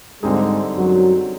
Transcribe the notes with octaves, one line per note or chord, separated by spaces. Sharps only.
G#2 D3 G3 G#3 C4 D#4 G#4
F#2 F#3